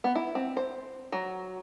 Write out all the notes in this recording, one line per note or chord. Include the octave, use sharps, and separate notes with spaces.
B3
E4
C4
C5
F#3